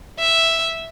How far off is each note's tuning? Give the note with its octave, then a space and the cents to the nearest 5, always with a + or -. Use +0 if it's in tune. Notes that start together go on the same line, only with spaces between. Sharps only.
E5 +0